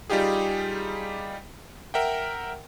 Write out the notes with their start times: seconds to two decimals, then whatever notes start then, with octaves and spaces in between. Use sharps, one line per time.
0.10 G3 D#4 F4 G4 G#4
1.94 A#4 E5 F#5 G5